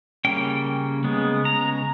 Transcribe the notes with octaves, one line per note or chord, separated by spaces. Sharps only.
C#3 G3 A#3 C#4 G5
C#3 G#3 B3
A#5